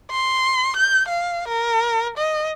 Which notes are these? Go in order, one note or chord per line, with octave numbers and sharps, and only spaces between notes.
C6
G6
F5
A#4
D#5